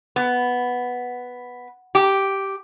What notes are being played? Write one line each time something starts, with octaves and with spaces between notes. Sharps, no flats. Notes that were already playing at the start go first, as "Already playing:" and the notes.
B3
G4